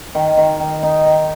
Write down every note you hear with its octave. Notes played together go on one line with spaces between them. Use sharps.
D#3
D#3
D#3
D#4
D#3